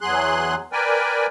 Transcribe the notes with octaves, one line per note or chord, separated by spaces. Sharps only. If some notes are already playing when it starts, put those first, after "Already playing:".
E2 F#3 G#4 C6 F#6
A#4 B4 D5 G5 G#5